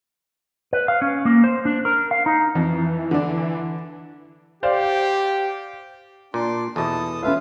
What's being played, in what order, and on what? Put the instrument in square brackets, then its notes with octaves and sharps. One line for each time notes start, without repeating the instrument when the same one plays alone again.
[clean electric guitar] B4
F5
C#4
A#3
C5
D4
A#4
F5
D#4
[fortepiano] F2 [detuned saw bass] E3
[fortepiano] D3 D4
[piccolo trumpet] G4 [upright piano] C5 D5 F5
[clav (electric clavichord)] A#2 [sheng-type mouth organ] D4 C6 D6
[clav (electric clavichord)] E2 B2 [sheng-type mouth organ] A4 A5 D#6
[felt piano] C#4 E5 [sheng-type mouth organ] F4 B4 F5